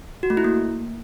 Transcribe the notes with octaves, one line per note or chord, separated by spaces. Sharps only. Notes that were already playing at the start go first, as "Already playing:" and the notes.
F#4
A3
E4
A#3